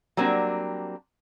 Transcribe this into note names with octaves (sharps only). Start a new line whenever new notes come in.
F#3 G3 A#3 C4 D4